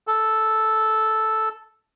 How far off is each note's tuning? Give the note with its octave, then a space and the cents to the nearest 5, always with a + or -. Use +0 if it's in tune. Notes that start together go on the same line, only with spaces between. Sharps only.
A4 -5